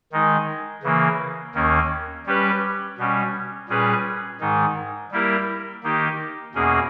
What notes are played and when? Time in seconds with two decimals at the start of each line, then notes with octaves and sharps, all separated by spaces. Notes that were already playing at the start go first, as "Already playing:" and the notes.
0.12 D#3 G#3 D#4
0.83 C#3 E3 A#3
1.54 D#2 D#3 A#3 C#4
2.27 G3 C#4 G4 B4
2.98 B2 G3 C#4
3.69 A#2 G3 C#4 G#4 B4
4.40 G#2 D#3 G#3 D#4
5.12 G3 A#3 E4 G4 A#4
5.83 D#3 A#3 D#4 G4
6.54 E2 B2 A#3 C#4 G#4